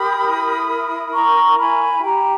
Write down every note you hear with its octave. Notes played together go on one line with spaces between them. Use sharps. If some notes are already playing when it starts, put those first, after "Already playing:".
Already playing: G4 A#4 B5 D#6
E4
A#4
E4 A#5 C#6
E4 G#5 B5
G4 G5 A#5